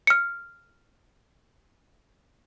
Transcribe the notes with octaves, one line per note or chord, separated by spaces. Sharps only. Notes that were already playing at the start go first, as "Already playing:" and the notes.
F6 C#7